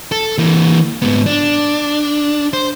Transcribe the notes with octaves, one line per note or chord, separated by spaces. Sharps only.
A4
E3 A#3
G#2 B3
D4
C5